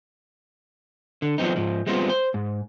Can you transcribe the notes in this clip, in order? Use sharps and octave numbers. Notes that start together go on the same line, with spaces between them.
D3
F3 F#3 B3 C4 D#4
G#2 F3
G3 G#3 B3 C4 F4
C5
G#2